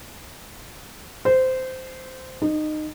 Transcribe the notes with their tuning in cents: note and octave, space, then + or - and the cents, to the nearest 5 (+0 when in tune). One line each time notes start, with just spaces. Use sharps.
C5 -15
D#4 -20